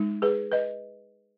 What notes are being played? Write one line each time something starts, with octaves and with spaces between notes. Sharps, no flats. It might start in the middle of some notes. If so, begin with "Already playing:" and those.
Already playing: G#3 D#4
G#4 B4
B4 D#5